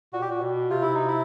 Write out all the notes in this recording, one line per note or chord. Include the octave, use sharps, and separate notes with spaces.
A#2 F#4
B2 G4
A#2 F#4
B2
C3 F4
E4
D#4
E4